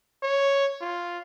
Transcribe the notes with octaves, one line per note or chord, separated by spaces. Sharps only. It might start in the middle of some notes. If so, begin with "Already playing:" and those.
C#5
F4